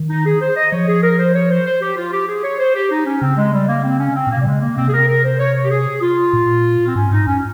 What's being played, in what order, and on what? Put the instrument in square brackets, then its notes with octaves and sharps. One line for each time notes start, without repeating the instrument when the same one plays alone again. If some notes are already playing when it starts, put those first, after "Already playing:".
Already playing: [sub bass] D#3
[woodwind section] D#4
G#4
C5
D#5
[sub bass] F3 [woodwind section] C#5
[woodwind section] G#4
A#4
C5
C#5
C5
C5
G4
F4
G4
G#4
C#5
C5
G4
D#4
C#4
[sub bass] C#3 [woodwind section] C4
[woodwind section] G#3
G3
A#3
C4
C#4
C4
[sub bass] A#2 [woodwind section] A#3
[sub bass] C3
[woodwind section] G3
[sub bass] C#3 [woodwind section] G#3
[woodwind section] A#3
[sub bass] C3 [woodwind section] C4
[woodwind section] G#4
A#4
A#4
C5
C#5
C#5
G4
G#4
F4
[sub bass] A#2
[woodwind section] C4
[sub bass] G#2 [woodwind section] C#4
[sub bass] G#2 [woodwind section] D#4
[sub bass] F2 [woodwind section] C#4